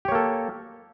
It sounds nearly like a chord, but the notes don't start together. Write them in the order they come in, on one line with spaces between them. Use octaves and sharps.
G4 C#5 A#3 A4